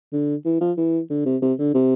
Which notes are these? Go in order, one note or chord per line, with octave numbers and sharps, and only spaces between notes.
D3
E3
F3
E3
D3
C3
C3
D3
C3